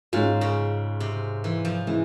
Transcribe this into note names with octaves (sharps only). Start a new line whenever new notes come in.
G#2 G#3 C#4 F4
C#3
C3
E3
F3
E3 G#3 E4